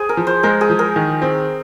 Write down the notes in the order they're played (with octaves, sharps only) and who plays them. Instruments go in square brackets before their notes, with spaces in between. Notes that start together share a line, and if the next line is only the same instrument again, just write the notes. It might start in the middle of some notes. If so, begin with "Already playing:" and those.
Already playing: [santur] G#4 C5
A#4
[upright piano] F3
[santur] C5
[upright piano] G#3 [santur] A#4
[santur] G#4
[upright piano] F3
[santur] A#4
[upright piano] D#3
C4